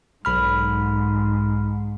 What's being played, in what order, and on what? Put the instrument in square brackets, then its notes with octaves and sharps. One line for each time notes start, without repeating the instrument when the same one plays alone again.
[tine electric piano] B1 B5 F6 [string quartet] G#2